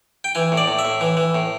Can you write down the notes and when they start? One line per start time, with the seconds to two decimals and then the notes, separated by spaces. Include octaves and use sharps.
0.24 G5
0.35 E3 G#5
0.52 A2
0.57 D5
0.68 A2
0.79 E5
0.85 A2
1.01 E3
1.17 E3
1.35 A2